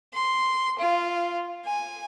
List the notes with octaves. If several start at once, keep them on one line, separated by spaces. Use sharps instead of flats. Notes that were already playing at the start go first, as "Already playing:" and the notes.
C6
F4
G#5